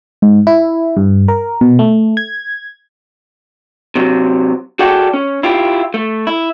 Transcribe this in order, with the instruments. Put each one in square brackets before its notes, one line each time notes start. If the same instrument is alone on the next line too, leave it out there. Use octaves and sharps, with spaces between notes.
[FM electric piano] G#2
E4
G2
A#4
B2
A3
G#6
[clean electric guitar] C3 F#3
F#4 G#4 A4 D5 F#5 G5
C#4
E4 F4 G4
A3
E4